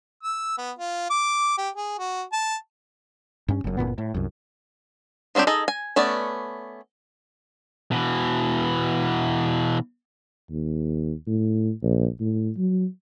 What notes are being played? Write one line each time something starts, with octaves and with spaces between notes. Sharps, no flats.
E6
B3
F4
D6
G4
G#4
F#4
A5
G2 C#4
F#1 F#2
F#1 E2 A#2 B3
A2
C2 F#2
F3 F#3 C4 D4 G4
D#4 G#4 A4 D#5
G#5
A3 B3 C#4 D5
B2 E3
D#2
A2
A#1
A2
F#3